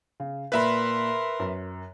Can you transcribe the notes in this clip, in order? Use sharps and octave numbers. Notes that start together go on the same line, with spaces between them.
C#3
A#2 A#4 B4 E5 B5 C6 F#6
F#2